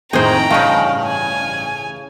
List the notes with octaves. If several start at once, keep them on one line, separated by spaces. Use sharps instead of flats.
F2 A2 D#3 G#4 C5 G5 A#5
A1 G2 C#3 D#5 F5 A5 C#6
G#5